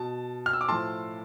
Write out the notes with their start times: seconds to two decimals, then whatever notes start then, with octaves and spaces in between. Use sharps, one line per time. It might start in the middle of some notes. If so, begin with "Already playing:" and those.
Already playing: B2 A5
0.46 F6
0.53 E6
0.61 D6
0.68 A2 F3 A5 C6